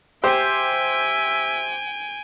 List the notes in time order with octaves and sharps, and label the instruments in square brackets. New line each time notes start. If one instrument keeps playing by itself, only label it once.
[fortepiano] G4 C5 [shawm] E5 [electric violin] G5 G#5